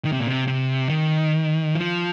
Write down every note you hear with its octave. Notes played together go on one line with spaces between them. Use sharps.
D#3
C3
A#2
C3
C3
D#3
F3